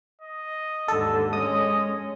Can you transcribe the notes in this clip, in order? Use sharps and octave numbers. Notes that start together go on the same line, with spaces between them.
D#5
D#2 G#2 D3 A4
G#3 C#4 D#5 D#6